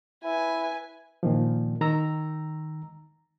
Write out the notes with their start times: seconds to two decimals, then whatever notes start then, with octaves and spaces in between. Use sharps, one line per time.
0.24 E4 B4 G#5
1.23 A#2 D#3 F3
1.81 D#3 A#5 E6